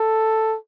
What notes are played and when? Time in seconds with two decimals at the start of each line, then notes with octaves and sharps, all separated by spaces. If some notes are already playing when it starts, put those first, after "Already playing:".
Already playing: A4